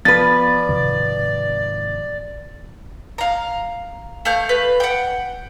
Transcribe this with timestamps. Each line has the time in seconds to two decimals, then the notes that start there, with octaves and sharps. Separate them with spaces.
0.05 F3 B3 B4 D5 A6
0.69 G#2 C3 D#3
3.18 F5 A#5
4.25 A3 F5 G6
4.49 B4
4.80 F#5 G5